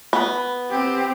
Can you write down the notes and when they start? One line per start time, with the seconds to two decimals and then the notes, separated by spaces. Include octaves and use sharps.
0.13 B3
0.71 C4 G4